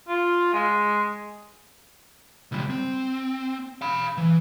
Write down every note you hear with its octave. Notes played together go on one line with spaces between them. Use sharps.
F4
G#3
C#2 G3
C4
F5 B5
E3